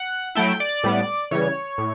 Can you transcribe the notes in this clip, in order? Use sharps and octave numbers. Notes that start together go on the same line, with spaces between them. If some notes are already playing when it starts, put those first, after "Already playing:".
Already playing: F#5
F#3 A3 E4 G5
D5
A2 G3 B3
C#3 E3 G3 C#5
A2